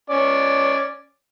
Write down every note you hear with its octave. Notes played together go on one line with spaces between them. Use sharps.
C#4 D5